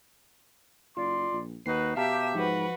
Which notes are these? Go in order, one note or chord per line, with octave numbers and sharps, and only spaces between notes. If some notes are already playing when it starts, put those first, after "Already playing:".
F#1 F4 D5 C6
A#1
D#2 D#4 F#4 B4 C7
B2 G4 E5 F5 A5 A#5
G#2 F3 F#4 B4